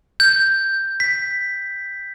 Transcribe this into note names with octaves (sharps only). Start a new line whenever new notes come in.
G6
B6